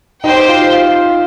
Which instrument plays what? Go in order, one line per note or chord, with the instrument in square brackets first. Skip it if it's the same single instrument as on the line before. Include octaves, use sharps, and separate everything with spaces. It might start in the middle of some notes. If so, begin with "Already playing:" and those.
[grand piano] D#4 [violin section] G4 C5 G5
[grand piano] F4
F4